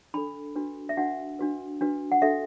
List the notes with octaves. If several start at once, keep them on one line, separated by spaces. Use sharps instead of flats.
D4 A4 B5
D4 F#4 B4
E5
D4 F#4 B4 F#5
D4 F#4 B4
D4 F#4 B4
F#5
D4 F#4 A4 E5